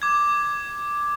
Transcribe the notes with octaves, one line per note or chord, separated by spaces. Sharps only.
D6 G#6